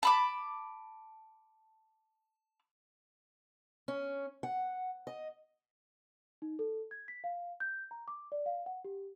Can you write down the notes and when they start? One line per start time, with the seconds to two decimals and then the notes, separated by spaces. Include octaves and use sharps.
0.03 A5 B5 D6
3.88 C#4
4.43 F#5
5.07 D#5
6.42 D#4
6.59 A4
6.91 G#6
7.08 B6
7.24 F5
7.60 G6
7.91 A#5
8.08 D6
8.32 D5
8.46 F5
8.66 F#5
8.84 G4